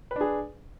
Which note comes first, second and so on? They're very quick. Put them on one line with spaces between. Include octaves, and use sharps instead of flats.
B4 D4 G#4